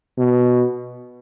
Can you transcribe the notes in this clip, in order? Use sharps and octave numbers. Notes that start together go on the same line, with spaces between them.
B2